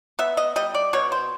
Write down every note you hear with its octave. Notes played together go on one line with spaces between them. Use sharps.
B3 E5
D#5
G3 D#5
D5
B2 C#5
C5